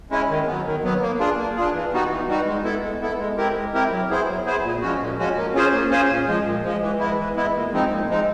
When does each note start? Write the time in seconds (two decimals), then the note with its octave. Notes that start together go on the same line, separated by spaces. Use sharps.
0.10 G#3 C#4 E4
0.29 D#3
0.47 F#3 B3
0.66 D#3
0.84 F#3 B3
1.02 A#3
1.19 D4 F4 G#4
1.38 A#3
1.56 D4 F4 G#4
1.74 E3
1.92 G3 B3 D#4 F#4
2.11 E3
2.28 G3 B3 D#4 F#4
2.47 G#3
2.64 B3 E4 A4
2.83 G#3
3.02 B3 E4 A4
3.19 G#3
3.37 C4 E4 G4 A#4
3.55 G#3
3.74 C4 E4 G4 A#4
3.92 F#3
4.10 B3 E4 G#4 C5
4.28 F#3
4.46 B3 E4 G#4 C5
4.63 A#2
4.82 F3 G#3 C#4 F#4
5.01 A#2
5.18 F3 G#3 C#4 F#4
5.37 A#3
5.55 C#4 F4 G#4 C5
5.73 A#3
5.90 C#4 F4 G#4 C5
6.09 A#2
6.28 F3 G#3
6.45 A#2
6.63 F3 G#3
6.82 E3
7.00 G#3 B3 E4
7.18 E3
7.36 G#3 B3 E4
7.54 A#2
7.72 F3 G#3 C4 D#4
7.90 A#2
8.09 F3 G#3 C4 D#4